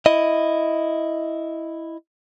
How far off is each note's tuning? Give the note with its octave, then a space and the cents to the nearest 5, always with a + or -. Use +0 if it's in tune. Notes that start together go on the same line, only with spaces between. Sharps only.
E4 +0 D#5 +0